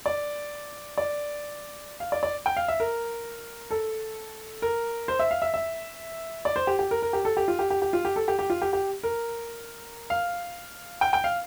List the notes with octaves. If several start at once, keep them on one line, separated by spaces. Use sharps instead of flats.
D5
D5
F5
D5
D5
G5
F5
E5
A#4
A4
A#4
C5
E5
F5
E5
E5
D5
C5
G4
G4
A#4
A#4
G4
A4
G4
F4
G4
G4
G4
F4
G4
A4
G4
G4
F4
G4
G4
A#4
F5
G5
G5
F5